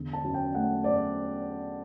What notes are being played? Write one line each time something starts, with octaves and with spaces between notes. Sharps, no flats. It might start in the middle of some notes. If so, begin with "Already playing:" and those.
Already playing: E2 D3
A5
F#2
G5
A3 F#5
F#2 D5